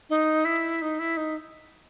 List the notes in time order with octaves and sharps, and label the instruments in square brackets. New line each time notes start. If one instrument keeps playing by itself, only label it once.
[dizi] D#4
E4
D#4
E4
D#4